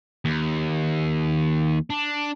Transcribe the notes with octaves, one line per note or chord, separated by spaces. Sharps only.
D#2
D4